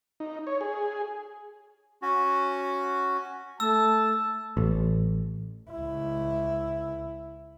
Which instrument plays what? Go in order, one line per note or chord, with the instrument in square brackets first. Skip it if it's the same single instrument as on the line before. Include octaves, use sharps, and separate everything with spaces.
[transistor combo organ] D#4
C#5
G#4
[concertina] C#4 F#4
[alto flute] A3 [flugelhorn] A5 [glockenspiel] E6
[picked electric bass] A1
[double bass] C#2 E4